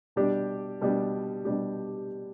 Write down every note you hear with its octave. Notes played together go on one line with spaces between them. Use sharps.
B2 G3 D4 G4
B2 G3 D4 G4
B2 G3 D4 G4